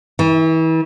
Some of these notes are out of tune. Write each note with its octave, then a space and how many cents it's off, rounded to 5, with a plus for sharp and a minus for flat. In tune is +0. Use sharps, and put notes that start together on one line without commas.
E3 -35